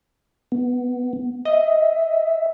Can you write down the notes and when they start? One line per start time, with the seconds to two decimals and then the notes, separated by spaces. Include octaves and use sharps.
0.52 B3
1.45 D#5 E5